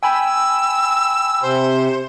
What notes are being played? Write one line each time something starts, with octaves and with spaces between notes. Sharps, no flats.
G5 G#5 B5 E6
C3 C5